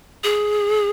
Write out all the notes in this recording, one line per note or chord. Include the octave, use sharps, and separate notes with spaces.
G#4